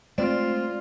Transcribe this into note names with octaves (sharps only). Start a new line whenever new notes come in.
G#3 A3 C4 F4 D5